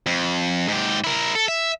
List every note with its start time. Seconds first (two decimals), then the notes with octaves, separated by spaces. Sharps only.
0.06 F2
0.68 G#2 G4
1.04 E4 A#4
1.35 A4
1.48 E5